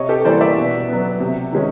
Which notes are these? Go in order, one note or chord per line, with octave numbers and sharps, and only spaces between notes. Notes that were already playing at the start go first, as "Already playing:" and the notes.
Already playing: C3 C#5 D#5
G4 A4
E3 G3 A#3 C5 D5
D5 E5
B2
F#3 B3
C3
D#3 G#3 C#4